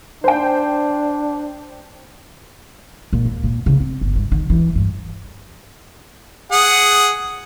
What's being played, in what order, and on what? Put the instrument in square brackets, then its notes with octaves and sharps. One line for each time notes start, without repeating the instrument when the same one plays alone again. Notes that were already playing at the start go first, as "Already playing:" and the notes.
[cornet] D4 [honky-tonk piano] C5 G5
[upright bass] A#2
D#2
A#2
C#3
C4
G1
G2
D#3
E3
G2
[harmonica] G#4 F#5